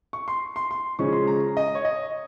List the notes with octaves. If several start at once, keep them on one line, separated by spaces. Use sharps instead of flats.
C#6
C6
C6
C6
C#3 F3 G#3 C#4 C#6
C6
A#5
D#5
C#5
D#5